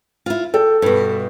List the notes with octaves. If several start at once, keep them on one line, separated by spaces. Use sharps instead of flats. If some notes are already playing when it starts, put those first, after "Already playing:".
E4 F4
A4 G5
G2 B2